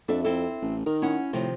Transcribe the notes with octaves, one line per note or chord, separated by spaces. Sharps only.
F2 D4 A4 E5
C4 E4 A4
A1
D#3 A#4
C#4 E4 F#5
A2 C3 D#3 F3